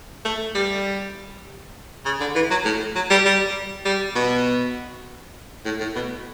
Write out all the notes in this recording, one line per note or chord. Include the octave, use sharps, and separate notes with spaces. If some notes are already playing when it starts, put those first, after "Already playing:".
A3
G3
C#3
D3
E3
F#3
A2
F#3
G3
G3
G3
B2
A2
A2
B2